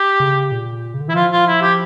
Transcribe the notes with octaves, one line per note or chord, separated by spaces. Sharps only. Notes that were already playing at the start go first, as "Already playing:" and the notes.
Already playing: G4
C#3
A#2
C#3
D3
E3 E4
F3 F4
F4
E4
G4